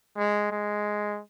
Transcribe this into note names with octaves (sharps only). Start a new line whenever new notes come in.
G#3
G#3